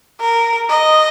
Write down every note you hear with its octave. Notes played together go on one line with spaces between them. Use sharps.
A#4
D#5